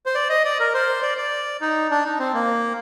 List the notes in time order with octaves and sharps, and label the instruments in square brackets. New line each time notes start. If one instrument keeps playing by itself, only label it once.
[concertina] C5
D5
D#5
D5
A#4
C5
D5
D5
D#4
D4
D#4
C4
A#3